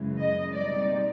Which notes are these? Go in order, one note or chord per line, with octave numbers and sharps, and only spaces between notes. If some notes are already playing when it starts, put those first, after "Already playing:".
Already playing: F#2 C#3 E3 G#3
D#5
B2 G3 C4 D#4 D5